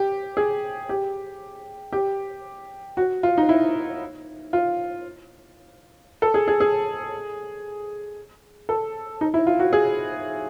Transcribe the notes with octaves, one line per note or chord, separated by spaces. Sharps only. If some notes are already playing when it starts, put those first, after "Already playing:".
Already playing: G4
G#4
G4
G4
F#4
F4
D#4
E4
F4
A4
G#4
G#4
G#4
A4
D#4
E4
F4
F#4
G#4